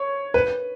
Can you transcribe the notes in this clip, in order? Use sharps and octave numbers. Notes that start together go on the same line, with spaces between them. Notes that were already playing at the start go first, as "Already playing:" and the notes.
Already playing: C#5
B4